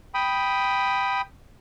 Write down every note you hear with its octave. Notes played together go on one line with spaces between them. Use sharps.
G5 B5 D#6